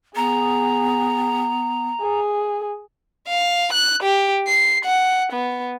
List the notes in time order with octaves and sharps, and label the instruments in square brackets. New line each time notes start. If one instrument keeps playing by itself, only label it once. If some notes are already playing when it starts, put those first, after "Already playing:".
[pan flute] B3 [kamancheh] G#4 [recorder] A#5
[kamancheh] G#4
[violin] F5
F#6
G4
C7
F#5
B3